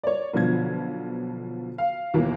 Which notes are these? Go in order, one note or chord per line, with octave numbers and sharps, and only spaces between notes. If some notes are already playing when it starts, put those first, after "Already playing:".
C#5 D5
B1 B2 D3 F3 B3 G#6
F5
D#2 B2 E3 A#3